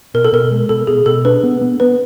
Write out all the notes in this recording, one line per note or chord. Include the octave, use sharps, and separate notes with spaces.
B2 A#4
A4
B2 A#4
G#3
B2 A4
B2 G#4
B2 A4
D4 B4
B3
B3
B3 B4